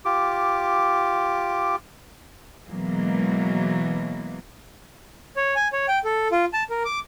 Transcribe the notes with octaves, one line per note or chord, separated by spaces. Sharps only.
F4 G4 D6
B2 E3 F#3 G#3 A#3
C#5
G#5
C#5
G5
A4
F4
A5
A#4
D6